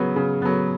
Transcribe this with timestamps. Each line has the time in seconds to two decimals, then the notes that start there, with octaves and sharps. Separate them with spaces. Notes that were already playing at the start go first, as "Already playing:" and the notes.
Already playing: C#3 F#3 B3
0.16 C#3
0.42 F#3 B3